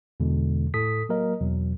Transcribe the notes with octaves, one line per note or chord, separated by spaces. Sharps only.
E2 B2 D3 G#3
A2 A4 D#6 B6
F#3 A#3 A#4 D#5
E2 B2 F#3